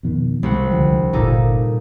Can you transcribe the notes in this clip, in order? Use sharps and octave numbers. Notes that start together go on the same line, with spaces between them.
F2 B2 D#3
C2 G#3 C4 F#5
D2 D3 F3
G1 A#2 D#4 A4